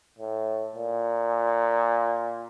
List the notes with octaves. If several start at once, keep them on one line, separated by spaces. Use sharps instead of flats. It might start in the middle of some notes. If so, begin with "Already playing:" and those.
A2
A#2